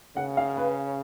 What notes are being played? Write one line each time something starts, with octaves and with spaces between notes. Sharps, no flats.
C#3 F#5
F5
B4